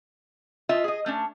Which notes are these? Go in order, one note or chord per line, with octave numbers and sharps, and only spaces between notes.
F4 D#5 E5
G#4 D#5
A3 C#4 D4